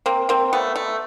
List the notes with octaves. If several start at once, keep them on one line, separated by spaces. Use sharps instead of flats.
A#3 C4
A#3 C4
A3 B3
A3